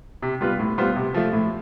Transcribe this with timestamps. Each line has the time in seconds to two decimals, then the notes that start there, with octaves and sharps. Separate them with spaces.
0.23 C3
0.41 G3 B3 F4 B4
0.59 A2
0.78 G3 B3 F4 C5
0.96 C3
1.14 F3 A3
1.33 A2